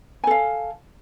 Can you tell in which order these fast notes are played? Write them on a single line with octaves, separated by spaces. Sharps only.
G#5 A4 F5